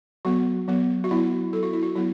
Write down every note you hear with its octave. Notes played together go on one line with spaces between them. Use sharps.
F#3 B3 F#4
F#3 B3
F#4
F#3 B3 E4
F#3 B3 A4
F#4
E4
F#4
F#3 B3 E4